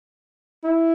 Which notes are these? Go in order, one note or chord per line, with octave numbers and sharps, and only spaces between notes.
E4